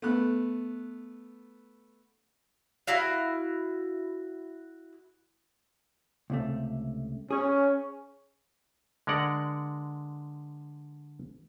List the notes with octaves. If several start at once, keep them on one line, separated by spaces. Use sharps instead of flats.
A3 B3 F#6
E4 F#4 F5
C#2 C3 A3
C#4 G#4 C#5
D3 G#3 A#4 D5 F#5